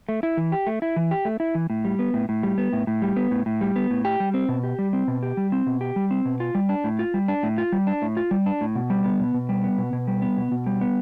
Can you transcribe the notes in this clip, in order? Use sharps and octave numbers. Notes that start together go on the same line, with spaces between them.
A3
E4
E3
G4
A3
E4
E3
G4
A3
E4
E3
A2
G3
B3
A2
A2
G3
B3
A2
A2
G3
B3
A2
A2
G3
B3
A2
G4
G3
C4
B2
G4
G3
C4
B2
G4
G3
C4
B2
G4
G3
C4
B2
F4
G3
D4
A2
F4
G3
D4
A2
F4
G3
D4
A2
F4
G3
D4
A2
B2
G3
B3
B2
B2
G3
B3
B2
B2
G3
B3
B2
B2
G3
B3